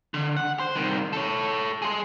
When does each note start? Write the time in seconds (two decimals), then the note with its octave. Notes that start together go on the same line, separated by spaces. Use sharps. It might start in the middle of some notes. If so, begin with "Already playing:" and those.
0.14 D3
0.37 F#5
0.59 C5
0.76 C2 D#3
1.13 A4 C#5
1.82 G#4 C6